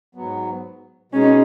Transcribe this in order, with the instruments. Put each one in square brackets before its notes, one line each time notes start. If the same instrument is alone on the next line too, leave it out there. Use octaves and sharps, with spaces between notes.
[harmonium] G#2 F#3 B3
[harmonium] B2 G#3 D#4 G#4 [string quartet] C#4